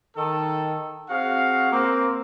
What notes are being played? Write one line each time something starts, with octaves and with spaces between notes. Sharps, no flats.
D#3 A4
C4 F#4 G#4 F5
A#3 C4